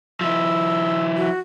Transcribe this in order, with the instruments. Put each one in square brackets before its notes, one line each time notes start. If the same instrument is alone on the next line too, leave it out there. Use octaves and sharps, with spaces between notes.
[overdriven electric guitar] F3 E4 [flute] E6
[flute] F#4